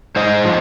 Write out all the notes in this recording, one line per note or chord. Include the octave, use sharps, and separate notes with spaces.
G#2 C5 D#5
F3